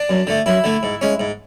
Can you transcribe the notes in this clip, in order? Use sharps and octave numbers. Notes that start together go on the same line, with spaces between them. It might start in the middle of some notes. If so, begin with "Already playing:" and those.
Already playing: D4
F#2
D3 A3
F#2 E4
D3 A3
G#2
G#3 C#4
G#2